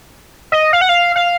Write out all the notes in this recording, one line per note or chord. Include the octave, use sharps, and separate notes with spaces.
D#5
F5
F#5
F5
F5